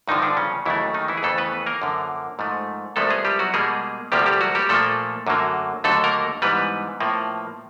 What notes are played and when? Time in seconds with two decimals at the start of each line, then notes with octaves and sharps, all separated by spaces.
0.08 G2 D3 D#3 F3 D#4
0.22 D3 D4
0.37 C#3 C#4
0.66 D#2 C#3 E3 F#3 A3 E4
0.94 D#3 D#4
1.08 E3 E4
1.17 G#4
1.23 F2 C#3 E3 A3 A4
1.38 B3 B4
1.66 A#3 A#4
1.82 F#2 D3 F3
2.39 G#2 F3 A3
2.96 C2 C3 F3 G#3 A3 B3 A4
3.10 G#3 G#4
3.25 G3 G4
3.39 F#3 F#4
3.54 B2 G3 G#3 A#3 G#4
4.12 D2 C3 F3 G3 A#3 G4
4.26 G3 G4
4.41 F#3 F#4
4.55 G3 G4
4.69 A#2 F3 A3 A#3 A4
5.27 F#2 D3 F#3 A#3
5.84 D#2 D3 F#3 A3 A4
6.04 A#3 A#4
6.42 G#2 E3 G3 B3 B4
7.00 A2 F3 A#3